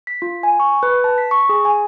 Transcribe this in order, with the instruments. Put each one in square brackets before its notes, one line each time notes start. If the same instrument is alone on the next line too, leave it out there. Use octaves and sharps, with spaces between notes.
[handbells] B6
F4
G#5
C#6
B4
A5
B6
C#6
G#4
G#5